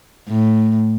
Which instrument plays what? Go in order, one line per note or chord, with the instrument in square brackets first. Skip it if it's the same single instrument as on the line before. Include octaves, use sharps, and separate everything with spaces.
[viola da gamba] A2